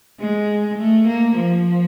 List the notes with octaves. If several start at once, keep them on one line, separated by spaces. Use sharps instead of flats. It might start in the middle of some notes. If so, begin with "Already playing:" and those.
G#3
A3
A#3
F3